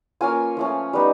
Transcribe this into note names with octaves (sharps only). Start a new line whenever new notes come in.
A#3 C#4 F4 G#5
F3 A3 C#4
G3 B3 D#4